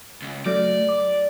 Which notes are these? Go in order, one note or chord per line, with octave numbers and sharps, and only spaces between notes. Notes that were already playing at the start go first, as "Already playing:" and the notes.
C#2
F#3 A3 D5
D6